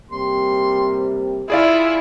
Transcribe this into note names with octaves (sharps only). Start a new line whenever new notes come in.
C3 G3 A#3 C6
E4 F4 G#4 D5 F5